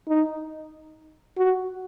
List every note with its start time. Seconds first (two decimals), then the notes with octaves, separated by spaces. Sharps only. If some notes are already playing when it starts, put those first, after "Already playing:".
0.08 D#4
1.38 F#4